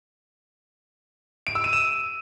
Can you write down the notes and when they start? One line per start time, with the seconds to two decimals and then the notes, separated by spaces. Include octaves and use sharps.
1.47 D7
1.55 E6
1.64 D#7
1.73 E7